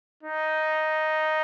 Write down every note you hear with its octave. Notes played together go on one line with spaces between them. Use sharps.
D#4